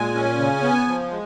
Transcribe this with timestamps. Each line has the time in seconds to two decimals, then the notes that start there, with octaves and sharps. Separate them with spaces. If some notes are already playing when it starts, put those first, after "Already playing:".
Already playing: A#2 G#3 G#5
0.15 C#4
0.39 C#3
0.62 B3
0.88 F3
1.11 G#3